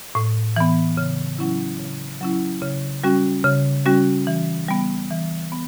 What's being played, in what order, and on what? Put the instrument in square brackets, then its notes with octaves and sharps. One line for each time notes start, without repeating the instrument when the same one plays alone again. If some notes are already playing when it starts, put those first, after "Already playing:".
[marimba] A2
E3 B3
C#3
F#3 C#4 E4
C#3
F#3 C#4 E4
C#3
G3 C#4 F#4
C#3
G3 C#4 F#4
E3
G3 B3
E3
B3